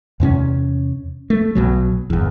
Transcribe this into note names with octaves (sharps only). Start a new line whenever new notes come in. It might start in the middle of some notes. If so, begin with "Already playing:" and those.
E2 C3 C4 C#4
A3
B1 B2 F#3
G1 E2